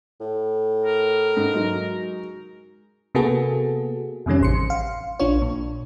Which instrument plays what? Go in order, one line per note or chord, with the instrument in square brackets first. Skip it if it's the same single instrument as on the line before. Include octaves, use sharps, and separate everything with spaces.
[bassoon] A2
[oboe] A#4
[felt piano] G#2
F#3 G#3 D#4
[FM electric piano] C3 A#3 B3 F#4 G#4 A4
F2 C3 D#3 G3 C#4
A1 C6 C#7
F5
A#1 D4 F4 C#5
A#2